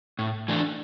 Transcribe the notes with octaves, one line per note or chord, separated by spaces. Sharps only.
A2
E3 A3 D4